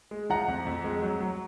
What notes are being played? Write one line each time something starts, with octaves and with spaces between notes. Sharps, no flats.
G#3
F3 F#5 A#5
F2
F2
G#3
F#3
F#3